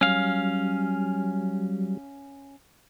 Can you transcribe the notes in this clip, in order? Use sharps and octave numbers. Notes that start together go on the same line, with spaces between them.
F#3 G3 C#4 F5